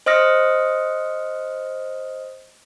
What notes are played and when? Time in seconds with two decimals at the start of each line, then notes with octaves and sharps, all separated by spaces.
0.06 C5 D#5 D#6 F6 A#6 C#7